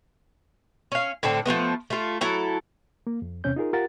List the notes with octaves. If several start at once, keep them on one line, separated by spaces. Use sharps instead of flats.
C#4 F5
A2 D3 C4 A4
F3 G#3 A3 B3
A3 F4
F#3 E4 A4
A#3
F2
E2 C3 C4 C#4 C#5 G6
D#4 F4 G#4 A#4
F4 G4 A#4 F#5 A6